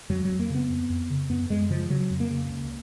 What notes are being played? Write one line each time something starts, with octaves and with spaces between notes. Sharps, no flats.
F2 F#3
F#3
F2
A#3
C#3 B3
F2
F2
C#3
F#2 B3
F#2 G#3
C#3 F3
C#3 F#3
F2
A#3
C#3
C#2